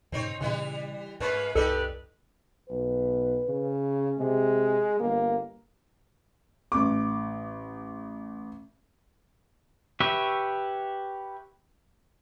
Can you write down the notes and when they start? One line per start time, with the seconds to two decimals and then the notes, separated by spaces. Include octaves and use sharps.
0.12 G2 A#2 C#3 C4 D#4 C#5
0.41 A#2 C#3 E3 G3 E4
1.20 G#2 G#3 A#3 C#4 B4
1.55 C2 F#2 D#4 G4 A4 B4 D5
2.70 B1 B4
3.48 C#3
4.20 C3 G#3
5.00 G1 A#3
6.72 A1 D6
10.00 G4 B4 C#5 E5